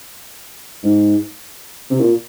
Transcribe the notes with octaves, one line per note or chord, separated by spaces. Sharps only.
G#2
C3
A#2